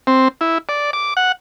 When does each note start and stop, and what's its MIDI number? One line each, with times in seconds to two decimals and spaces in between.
0.07 0.28 60
0.41 0.58 64
0.69 0.91 74
0.93 1.14 86
1.17 1.32 78